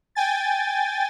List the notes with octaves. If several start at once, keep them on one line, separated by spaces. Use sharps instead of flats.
G5 G#5 A6